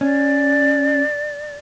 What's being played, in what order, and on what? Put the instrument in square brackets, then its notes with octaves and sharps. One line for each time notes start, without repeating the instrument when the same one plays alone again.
[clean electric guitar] C#4 [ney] D5